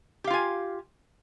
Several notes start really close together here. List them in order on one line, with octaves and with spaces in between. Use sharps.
G4 F5 F4 G#5